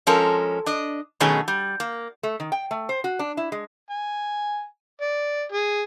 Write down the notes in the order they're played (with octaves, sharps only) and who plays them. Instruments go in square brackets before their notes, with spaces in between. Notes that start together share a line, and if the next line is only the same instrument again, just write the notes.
[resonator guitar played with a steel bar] F3 G#3 C#4 A4 A#4
D4 D#5
B2 D#3 F#3 A3 C#4 G#4
G3
A#3
A3
D#3
G5
A3
C5
F#4
D4
E4
G#3
[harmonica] G#5
D5
G#4